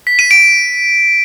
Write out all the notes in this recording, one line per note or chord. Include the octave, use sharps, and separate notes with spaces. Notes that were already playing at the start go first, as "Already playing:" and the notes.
B6
D#7
D7